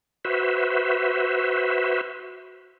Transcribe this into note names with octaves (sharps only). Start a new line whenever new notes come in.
F#4 B4 C5 E5